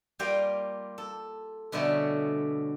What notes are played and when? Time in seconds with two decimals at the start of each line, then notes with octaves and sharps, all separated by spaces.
0.19 G3 A#3 F4 G4 F5 G5
0.98 A4
1.72 B2 D3 G3 A3 B3 C#4